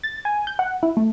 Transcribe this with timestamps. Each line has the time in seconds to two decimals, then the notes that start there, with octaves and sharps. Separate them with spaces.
0.03 A6
0.25 G#5
0.47 G6
0.59 F#5
0.83 E4
0.97 A3